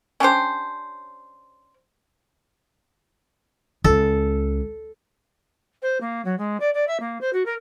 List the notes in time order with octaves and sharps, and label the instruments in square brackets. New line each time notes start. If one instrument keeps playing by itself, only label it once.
[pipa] C#4 D4 G4 C5
[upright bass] C#2 [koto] A4
[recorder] C5
A#3
F#3
G#3
D5
D5
E5
A#3
C5
F#4
A#4